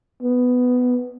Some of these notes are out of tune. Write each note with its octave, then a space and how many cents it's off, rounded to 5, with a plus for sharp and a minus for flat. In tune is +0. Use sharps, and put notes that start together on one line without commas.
B3 +10